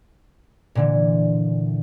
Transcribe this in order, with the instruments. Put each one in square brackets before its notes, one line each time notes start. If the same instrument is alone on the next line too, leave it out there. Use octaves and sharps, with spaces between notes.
[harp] A#2 D3 E3